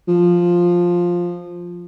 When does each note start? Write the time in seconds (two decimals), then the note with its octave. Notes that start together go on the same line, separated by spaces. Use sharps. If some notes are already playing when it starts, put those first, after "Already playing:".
0.08 F3